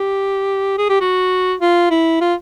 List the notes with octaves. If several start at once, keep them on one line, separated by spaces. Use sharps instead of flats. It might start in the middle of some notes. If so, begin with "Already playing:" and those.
Already playing: G4
G#4
G4
F#4
F4
E4
F4